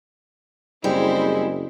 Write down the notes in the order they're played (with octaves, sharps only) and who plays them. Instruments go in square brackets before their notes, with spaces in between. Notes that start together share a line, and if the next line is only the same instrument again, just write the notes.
[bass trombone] F#1 [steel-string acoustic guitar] G3 [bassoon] G#3 [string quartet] C4 E4 C5